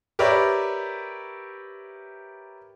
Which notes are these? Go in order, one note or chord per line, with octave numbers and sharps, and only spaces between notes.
G4 A#4 B4 C#5 D5 E5